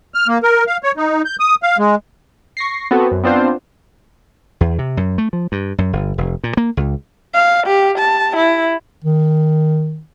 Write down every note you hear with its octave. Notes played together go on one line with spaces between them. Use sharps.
F6
A#3
A#4
F5
C#5
D#4
G6
D#6
F5
G#3
C#6 A#6 C7
B3 C4 F#4 A4
F#2
B3 C4 D4 F4 C5
E2
C3
F#2
A3
F3
G2
F#2
G1
F1
A#2
A#3
C#2
F5
G4
A5
E4
D#3